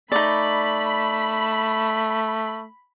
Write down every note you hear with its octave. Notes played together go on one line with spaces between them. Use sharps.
A3 D#4 D5 B5